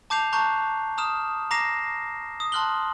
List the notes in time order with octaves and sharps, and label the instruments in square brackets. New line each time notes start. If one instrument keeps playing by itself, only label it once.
[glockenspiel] A5 D6 G6 C7 F7
A5 A#5 C#6 F#6 G6
A#5 D#6 F6 E7
A#5 D6 A#6 C7 E7
D#6
A5 C6 F6 F#6 F#7 G7